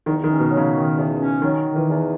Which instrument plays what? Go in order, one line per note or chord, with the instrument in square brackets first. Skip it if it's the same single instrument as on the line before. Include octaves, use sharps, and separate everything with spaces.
[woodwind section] E2 [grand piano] D#3
[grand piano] D#3
[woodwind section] C#4
[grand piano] B2
[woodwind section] F#3
[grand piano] C#3
[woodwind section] D#3
E2
C#4
[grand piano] D#3 [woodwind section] F#3
[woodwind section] D#3
[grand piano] E3
[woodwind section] E2